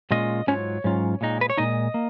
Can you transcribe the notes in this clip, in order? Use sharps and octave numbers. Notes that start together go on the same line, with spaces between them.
A#2 G#3 C#4 F4 D#5
G#2 F#3 C#4 F4 C#5
G#2 F#3 C#4 F4
A#2 G#3 D#4
B4
C#5
A#2 G#3 D#4 D#5
A#3